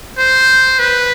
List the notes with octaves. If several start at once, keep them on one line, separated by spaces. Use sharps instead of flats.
C5
B4